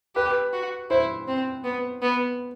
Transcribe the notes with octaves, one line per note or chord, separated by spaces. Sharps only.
G4 B4
F#4
E4 C5
C4
B3
B3